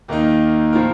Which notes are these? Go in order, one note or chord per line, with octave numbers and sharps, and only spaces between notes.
D#2 D#3 A#3 D#4
A2 F3 C4 F4 A#4